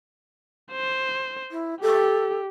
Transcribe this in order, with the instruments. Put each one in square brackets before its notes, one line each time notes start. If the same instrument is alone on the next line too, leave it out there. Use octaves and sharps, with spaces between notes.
[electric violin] C5
[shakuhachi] E4
[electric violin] G4 [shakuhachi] A4